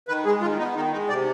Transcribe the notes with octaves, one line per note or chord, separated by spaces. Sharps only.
D#3 B4
G#3 G#4
D#3 F4
B3 D#4
D#3 D#4
G#3 D#4
C3 D5